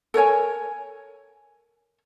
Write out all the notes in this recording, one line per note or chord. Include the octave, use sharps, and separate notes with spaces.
A4 A#4 C#5 G#5